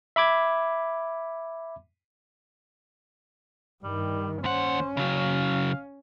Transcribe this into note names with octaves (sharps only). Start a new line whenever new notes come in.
E5 B5 D6 G#6
G2 D#3 G3
D#2 C#4 C5 F#5
C#3 F#3 F5